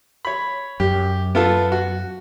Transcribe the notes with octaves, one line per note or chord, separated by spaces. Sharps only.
C#5 B5
F#2 G4
B3 F4 A4
F#4